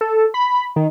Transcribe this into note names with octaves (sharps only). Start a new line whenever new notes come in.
A4
B5
D#3